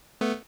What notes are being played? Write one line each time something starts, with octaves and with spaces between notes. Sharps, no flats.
A3 B3